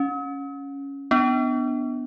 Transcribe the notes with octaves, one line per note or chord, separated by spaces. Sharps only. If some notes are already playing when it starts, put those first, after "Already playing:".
Already playing: C#4
B3 D4